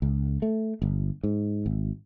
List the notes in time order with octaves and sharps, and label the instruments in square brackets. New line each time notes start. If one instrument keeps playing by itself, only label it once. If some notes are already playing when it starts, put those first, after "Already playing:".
[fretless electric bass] C#2
A3
G1
G#2
G#1